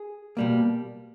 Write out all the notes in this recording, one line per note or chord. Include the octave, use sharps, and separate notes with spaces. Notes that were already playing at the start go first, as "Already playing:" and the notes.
Already playing: G#4
B2 G3 A#3